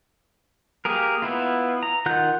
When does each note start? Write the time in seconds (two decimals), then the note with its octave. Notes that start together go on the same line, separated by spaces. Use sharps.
0.85 A#3 G4 G#4 A#4
1.22 B3 E4 F4
1.83 A#5
2.06 D#3 F4 F#5 F#6 G6